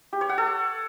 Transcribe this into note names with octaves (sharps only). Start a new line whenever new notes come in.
G4
C#5
F#5
A4